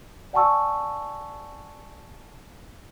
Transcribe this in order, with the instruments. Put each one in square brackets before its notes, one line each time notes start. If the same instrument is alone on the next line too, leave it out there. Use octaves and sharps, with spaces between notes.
[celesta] D5 F#5 G#5 A5 C#6 E6